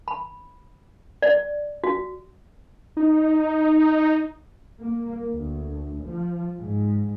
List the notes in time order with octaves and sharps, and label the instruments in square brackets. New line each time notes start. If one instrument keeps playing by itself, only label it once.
[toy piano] B5
D5
F#4
[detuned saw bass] D#4
[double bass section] A#3
D2
F3
G#2